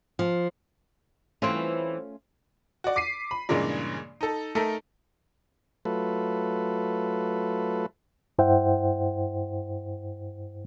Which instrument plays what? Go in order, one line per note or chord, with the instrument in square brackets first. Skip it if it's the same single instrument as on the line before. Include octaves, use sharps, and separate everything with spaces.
[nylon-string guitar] F3
[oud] E3 C4 [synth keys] A3 C#4 F4
[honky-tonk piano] F#4 D5
D6 B6 C7 D#7
B5
G2 A#2 C#3 E3 G#3 A#3
D#4 A4
A3 D#4 A4 A#4
[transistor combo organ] F#3 A3 F4 A4 B4
[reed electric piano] G2 E4 C5 E5 F#5 G5